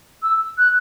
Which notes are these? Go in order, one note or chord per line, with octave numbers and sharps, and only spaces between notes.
E6
F#6